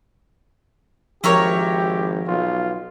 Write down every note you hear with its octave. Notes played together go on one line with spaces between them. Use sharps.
G#1 F3 E4 G4 A#4 C#5
B1 F4